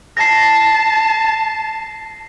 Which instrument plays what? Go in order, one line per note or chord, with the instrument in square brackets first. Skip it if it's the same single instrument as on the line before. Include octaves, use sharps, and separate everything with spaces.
[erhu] A5 [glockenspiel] A#6 C7